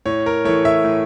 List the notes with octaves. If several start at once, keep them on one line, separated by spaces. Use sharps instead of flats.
A2 C#5
A#4
E3 A3 C#5
E5
A2